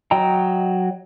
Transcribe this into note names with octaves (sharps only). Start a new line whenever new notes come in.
F#3 D#5 G5 A#5